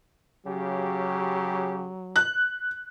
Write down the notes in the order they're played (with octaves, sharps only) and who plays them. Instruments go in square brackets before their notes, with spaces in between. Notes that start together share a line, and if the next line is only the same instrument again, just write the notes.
[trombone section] C#3 G4 [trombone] F#3
[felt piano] F#6